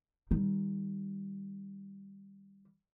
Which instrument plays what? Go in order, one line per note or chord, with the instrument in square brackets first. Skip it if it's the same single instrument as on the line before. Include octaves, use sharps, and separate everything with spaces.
[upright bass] D#3 G3